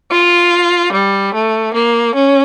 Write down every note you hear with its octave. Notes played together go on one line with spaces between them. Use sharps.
F4
G3
A3
A#3
C#4